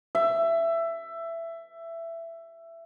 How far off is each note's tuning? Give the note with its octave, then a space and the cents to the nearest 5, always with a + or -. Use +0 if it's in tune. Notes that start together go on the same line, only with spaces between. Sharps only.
E5 +15